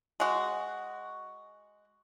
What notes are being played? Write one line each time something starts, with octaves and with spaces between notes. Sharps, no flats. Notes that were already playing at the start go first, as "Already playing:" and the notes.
G#3 F#4